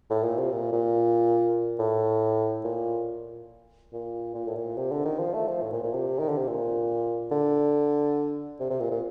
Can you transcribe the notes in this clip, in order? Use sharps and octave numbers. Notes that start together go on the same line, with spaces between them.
A2
A#2
C3
A#2
A#2
A2
A#2
A#2
A#2
A2
A#2
C3
D3
D#3
F3
A3
F3
A2
A#2
A#2
C3
D#3
D3
C3
A#2
D3
C3
C3
A#2
A#2